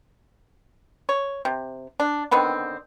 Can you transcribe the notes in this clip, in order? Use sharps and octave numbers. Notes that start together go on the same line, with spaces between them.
C#5
C3
D4
D3 D#3 B3 C4